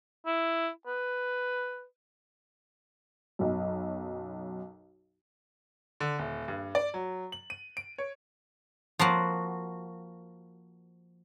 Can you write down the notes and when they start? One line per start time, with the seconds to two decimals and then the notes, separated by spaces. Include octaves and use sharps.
0.27 E4
0.87 B4
3.39 B1 F#2
6.00 D3
6.19 D#1
6.48 G2
6.75 D5
6.94 F#3
7.32 F#7
7.50 D#7
7.77 D7
7.98 C#5
8.99 F3 A#3 F#4